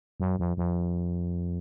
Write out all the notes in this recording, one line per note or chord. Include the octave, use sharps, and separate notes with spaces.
F#2
F2
F2